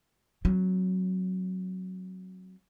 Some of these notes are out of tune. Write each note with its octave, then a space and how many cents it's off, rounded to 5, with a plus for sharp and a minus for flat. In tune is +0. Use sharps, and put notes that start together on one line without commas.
F#3 +0 C4 +10